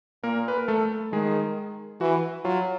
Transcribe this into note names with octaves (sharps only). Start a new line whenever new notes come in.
A#2 A#3 A#4
B4
A#4
A3 A4
D#3 G#3 G#4
E3 F#4
F#3 F4